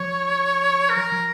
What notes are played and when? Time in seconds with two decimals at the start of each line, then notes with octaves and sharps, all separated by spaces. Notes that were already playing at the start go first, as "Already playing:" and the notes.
Already playing: F3 C#5
0.89 A#4
1.12 F3